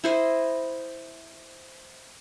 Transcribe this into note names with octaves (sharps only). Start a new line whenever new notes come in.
E4 C5 D#5